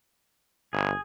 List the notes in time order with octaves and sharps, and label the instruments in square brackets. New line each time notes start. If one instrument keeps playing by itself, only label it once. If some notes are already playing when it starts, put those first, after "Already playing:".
[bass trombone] G1 [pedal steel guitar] G#4